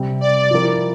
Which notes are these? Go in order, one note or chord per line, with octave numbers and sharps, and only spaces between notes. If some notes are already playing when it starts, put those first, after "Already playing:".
Already playing: C3 G3 C4
D5
F3 C4 E4 A#4 D5